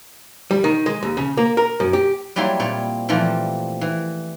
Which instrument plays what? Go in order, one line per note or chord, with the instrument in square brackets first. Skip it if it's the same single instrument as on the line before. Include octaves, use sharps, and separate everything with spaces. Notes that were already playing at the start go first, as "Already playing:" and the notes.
[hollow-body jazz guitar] G3
D#3
G#3
D#2
C#3
A#3
A#4
F#2
G4
[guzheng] F#3 G3 A#3 E4 C#5 C6
A#2 C4 C#5
A#2 E3 F3 G3 A3 C4
E3